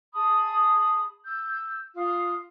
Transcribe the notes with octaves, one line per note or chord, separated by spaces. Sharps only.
G#4 A5 B5 D#6
E6 G6
F4 D#6